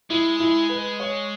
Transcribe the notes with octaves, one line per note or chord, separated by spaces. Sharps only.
G#3 E4
E4
B4
C#5